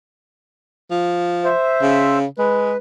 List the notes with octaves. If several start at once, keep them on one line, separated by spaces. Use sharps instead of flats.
F3
C5 E5
C#3
G#3 B4